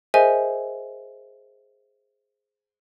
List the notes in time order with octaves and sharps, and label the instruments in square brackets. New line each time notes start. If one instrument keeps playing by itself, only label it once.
[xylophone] G#4 A#4 C5 D#5 E5 G#5